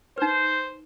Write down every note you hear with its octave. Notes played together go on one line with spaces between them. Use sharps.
D#4 B4 C5